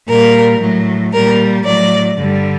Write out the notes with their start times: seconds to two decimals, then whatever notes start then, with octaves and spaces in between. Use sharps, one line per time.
0.09 A#2 G3 A#4
0.61 A2 F#3
1.13 A#2 G3 A#4
1.66 A2 F#3 D5
2.18 G2 D3 G3